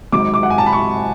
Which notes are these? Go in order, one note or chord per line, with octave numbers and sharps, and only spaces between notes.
G#1 G#2 F#3 D6
D6
F#5
G#5
A5
B5
C#6